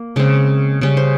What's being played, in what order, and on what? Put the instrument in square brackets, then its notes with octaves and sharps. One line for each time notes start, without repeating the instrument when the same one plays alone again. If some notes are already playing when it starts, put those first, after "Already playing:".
Already playing: [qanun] A#3
C#3 G#3 C4
C#3 G3 C#4
C5